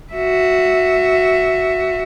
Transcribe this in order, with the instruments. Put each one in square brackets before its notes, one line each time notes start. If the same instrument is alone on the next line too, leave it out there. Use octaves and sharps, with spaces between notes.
[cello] F#4 E5